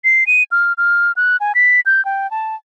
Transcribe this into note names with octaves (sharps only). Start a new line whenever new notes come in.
C7
D#7
F6
F6
F#6
G#5
B6
G6
G5
A5